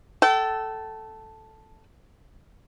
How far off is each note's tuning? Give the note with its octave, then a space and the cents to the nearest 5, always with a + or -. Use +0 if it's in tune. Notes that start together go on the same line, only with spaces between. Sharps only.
A4 +0 G5 -40